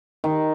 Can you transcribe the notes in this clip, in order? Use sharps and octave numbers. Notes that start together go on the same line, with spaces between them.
D#3